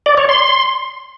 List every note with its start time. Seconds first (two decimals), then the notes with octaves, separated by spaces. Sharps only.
0.06 D5
0.17 C#5
0.29 C6